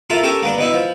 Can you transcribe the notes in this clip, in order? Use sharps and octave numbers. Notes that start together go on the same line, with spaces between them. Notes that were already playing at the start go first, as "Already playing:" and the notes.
A#3 E4 F4 A4
C#4 G4 A4 A#4
A#3 B3 D4
B2 D#4 E4
F3